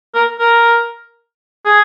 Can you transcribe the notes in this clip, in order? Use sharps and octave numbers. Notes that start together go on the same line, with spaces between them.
A#4
A#4
G#4